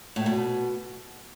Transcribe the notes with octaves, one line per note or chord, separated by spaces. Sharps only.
A2
B2